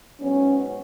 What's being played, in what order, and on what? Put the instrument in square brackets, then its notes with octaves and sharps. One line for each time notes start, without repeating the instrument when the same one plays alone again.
[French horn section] G#2 F#3 B3 C#4